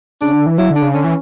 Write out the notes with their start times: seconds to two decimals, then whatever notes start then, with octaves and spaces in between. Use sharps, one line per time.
0.21 C#3 D4
0.33 D3
0.46 E3
0.58 F#3 E4
0.71 D3
0.76 D4
0.82 C#3
0.94 D3 C#4
1.04 E3